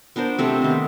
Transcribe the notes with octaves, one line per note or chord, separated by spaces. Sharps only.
B3 D4 A#4 C5
C3 A3 C4
D#3 B3